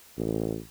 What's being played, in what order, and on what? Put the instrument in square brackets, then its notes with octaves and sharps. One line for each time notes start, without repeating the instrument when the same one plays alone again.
[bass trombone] A1